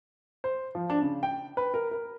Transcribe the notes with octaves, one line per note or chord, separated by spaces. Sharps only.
C5
F3
D4
C#3
G5
B4
A#4
A#4